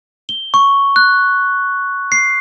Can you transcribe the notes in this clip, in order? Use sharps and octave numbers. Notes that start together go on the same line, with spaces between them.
G7
C#6
F#6
C7